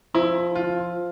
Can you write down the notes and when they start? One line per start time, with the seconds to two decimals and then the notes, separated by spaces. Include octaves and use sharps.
0.15 F3 E4
0.55 F4